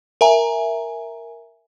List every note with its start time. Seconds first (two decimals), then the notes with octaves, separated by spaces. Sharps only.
0.21 A#4 E5 G#5 A#5